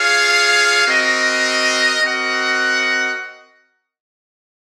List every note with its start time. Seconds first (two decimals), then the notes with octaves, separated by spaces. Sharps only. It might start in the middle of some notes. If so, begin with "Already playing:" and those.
Already playing: F4 G#4 C#5 F5
0.87 C4 F#4 A#4 D#5
2.02 C4 F#4 A#4 D#5 F#5